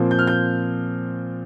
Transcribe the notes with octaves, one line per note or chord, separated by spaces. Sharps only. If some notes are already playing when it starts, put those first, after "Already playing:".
Already playing: A#2 F3 C4
G6
F6
G6